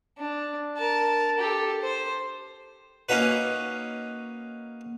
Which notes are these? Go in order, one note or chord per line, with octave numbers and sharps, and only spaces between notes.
D4
A#4 A5
G4 A4
C5
A#3 C#4 D#4 F#4 B4